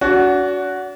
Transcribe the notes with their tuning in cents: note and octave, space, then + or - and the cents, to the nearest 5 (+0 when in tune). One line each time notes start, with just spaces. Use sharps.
D4 -45 F#4 +0